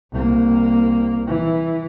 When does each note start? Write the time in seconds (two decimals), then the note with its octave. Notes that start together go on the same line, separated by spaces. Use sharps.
0.12 C2 A#3
1.27 E3